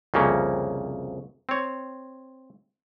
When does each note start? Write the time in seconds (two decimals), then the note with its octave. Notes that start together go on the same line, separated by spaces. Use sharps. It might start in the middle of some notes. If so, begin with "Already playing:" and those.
0.14 C2 F2 C#3 A#3 C#4
1.49 C4 C#5